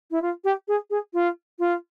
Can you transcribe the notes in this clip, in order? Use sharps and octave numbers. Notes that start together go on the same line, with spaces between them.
E4
F4
G4
G#4
G#4
F4
F4